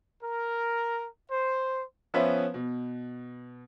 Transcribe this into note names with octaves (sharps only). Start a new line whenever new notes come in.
A#4
C5
F3 B3 C#4 B4 C5 E5
B2